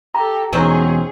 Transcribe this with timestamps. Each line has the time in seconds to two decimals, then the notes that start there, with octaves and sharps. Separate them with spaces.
0.15 G4 A4 A#5
0.52 E2 B2 D#3 F#3 C4 C#4 G#4